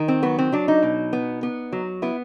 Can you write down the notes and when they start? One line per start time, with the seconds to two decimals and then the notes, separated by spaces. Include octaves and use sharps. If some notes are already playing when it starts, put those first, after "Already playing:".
Already playing: D#3
0.08 C4
0.22 F#3 B3
0.38 C4
0.52 F#3 D4
0.68 D#4
0.83 B2
1.13 B3
1.43 B3
1.72 F#3
2.02 B3 E4